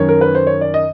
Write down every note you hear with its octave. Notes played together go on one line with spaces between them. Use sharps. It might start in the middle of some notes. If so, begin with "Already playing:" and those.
Already playing: F#2 D#3 C#5
A#4
B4
C5
C#5
D5
D#5